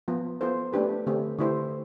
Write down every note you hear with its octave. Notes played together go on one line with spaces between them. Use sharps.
F3 B3 F4
B3 F4 A4 C5
A3 D4 G4 B4
D3 A3 C4 G4
D3 A3 E4 G4 C5